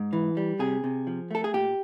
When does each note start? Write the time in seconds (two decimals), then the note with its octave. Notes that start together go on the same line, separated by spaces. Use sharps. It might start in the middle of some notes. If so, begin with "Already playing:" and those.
Already playing: G#2
0.13 E3
0.37 G3
0.59 C3 G#4
0.84 C3
1.07 F3
1.31 A3 A4
1.44 G#4
1.54 A#2 G4